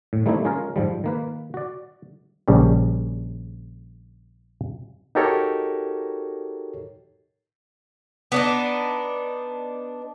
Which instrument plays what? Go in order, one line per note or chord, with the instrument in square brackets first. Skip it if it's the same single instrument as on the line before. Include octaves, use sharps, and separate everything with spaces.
[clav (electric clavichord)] A2
G3 A3 A#3 C4 D#4 E4
G#3 C#4 F4 G#4 A#4
G#2 F3 G3
D#3 A#3 B4
F#4 D5
A#1 C#3 G3
[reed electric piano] D#4 F#4 G4 A4 A#4 C#5
[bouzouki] B3 D4 D#4